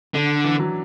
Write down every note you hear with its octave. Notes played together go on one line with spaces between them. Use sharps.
D3 D4
E3
F#3